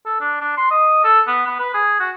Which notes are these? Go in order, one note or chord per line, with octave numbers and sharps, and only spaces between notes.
A4
D4
D4
C6
D#5
A4
B3
B3
B4
G#4
F#4